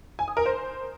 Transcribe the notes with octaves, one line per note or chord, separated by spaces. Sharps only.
G#5
D#6
A#4
C5